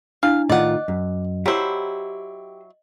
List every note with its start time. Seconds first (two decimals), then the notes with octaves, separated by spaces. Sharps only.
0.23 D4 E4 F5
0.49 A2 D#3 F4 D5 D#5 F#5
0.88 F#2
1.46 F#3 E4 G4 C5